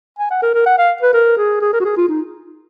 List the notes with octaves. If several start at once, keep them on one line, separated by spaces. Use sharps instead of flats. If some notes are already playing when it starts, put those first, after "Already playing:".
G#5
F#5
A#4
A#4
F#5
F5
B4
A#4
G#4
G#4
A#4
F#4
G#4
F4
D#4